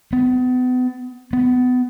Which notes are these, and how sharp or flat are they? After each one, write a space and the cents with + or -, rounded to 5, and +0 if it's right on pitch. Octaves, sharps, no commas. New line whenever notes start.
B3 +35
B3 +25